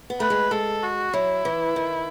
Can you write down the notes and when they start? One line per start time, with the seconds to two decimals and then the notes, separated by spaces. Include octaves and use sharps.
0.10 B3
0.20 A3 B4
0.30 G#3
0.51 G#3 A4
0.83 F#4
1.14 F#3 E4
1.45 E3
1.76 D#3